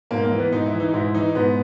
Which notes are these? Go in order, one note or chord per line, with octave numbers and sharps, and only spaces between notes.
G#2 A#3
A#3
E3
B3
G#2 D#4
E4
E3
D#4
G#2 E4
E3 D#4
G#2 B3